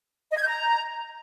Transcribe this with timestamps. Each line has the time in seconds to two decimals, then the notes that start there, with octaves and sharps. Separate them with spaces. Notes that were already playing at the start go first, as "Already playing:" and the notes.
0.31 D#5
0.36 G#6
0.42 G6
0.47 A#5